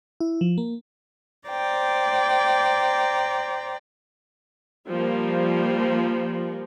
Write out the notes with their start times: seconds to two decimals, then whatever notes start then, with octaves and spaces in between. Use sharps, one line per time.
0.20 E4
0.41 F3
0.58 A#3
1.48 C5 D5 G5 A#5
4.90 F3 G3 A#3